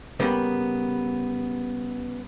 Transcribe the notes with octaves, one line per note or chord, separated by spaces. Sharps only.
C#3 G3 A#3 B3 B4